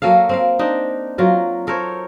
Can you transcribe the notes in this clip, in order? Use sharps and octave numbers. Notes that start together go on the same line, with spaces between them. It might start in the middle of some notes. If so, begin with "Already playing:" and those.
F#3 A#3 A4 F5
C4 A#4 F5
C4 D4 D#4
F#3 F4 A#4
A4 A#4 C5 C#5